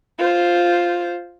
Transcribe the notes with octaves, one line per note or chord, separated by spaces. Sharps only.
F4 C5